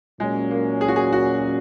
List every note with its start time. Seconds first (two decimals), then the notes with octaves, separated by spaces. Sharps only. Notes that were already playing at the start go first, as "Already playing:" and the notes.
0.20 A#2 F#3 G#3 C#4
0.51 A#3
0.81 G#4
0.88 F#4
0.96 G#4
1.13 F#4